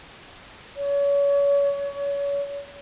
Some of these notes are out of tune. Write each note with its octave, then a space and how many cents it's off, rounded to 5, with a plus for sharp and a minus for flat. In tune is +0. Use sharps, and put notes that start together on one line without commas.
C#5 +30